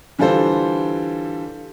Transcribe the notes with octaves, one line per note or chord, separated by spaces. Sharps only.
D3 E3 G3 F4 A4 C5